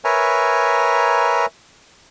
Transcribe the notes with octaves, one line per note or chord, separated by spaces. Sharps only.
A#4 B4 C#5 E5 G#5 A#5